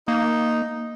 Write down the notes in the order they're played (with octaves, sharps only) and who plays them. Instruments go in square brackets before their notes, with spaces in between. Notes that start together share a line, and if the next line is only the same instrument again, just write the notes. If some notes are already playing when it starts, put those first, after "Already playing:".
[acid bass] A#3 [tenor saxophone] D#4